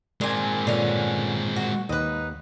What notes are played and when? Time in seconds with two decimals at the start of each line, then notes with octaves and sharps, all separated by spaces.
0.21 A#2 G#3 C4 G#5
0.67 A#2 D3 C#4
1.56 F#4
1.89 D#2 D#4 B4